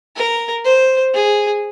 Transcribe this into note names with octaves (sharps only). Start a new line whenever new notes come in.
A#4
C5
G#4